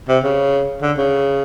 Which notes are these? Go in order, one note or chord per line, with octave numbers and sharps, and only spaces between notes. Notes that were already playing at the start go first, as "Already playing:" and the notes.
C3
C#3
D3
C#3